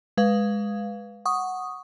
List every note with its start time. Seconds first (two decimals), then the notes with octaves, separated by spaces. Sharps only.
0.17 G#3 B4 F5
1.25 F#5 C#6 D#6